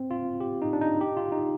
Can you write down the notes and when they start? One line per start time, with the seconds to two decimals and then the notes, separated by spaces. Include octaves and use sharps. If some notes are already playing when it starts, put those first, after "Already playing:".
Already playing: C4
0.11 F4
0.40 G4
0.62 D#4
0.73 D4
0.81 D#4
1.01 G4
1.17 F4
1.32 D#4